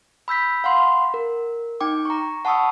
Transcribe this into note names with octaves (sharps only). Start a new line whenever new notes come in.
B5 E6 G6 B6
F5 F#5 B5 C6
A#4
D#4 G5 D6
A#5 C#6
F#5 A5 B5 C#6 D#6 E6